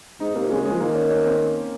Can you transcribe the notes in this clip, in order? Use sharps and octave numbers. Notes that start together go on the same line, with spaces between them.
G#2 D#4
C3 A#3
C#3 G#3
C#3
F3 G#3
D#3 A#3
C#4
C#4
C4